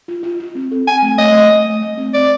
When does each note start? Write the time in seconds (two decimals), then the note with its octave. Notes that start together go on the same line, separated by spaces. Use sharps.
0.08 F4
0.23 F4
0.40 F4
0.55 C4
0.71 A4
0.88 C4 G#5
1.02 A3
1.19 A3 D#5
1.35 A3
1.51 A3
1.66 A3
1.82 A3
1.97 C4
2.14 A3 D5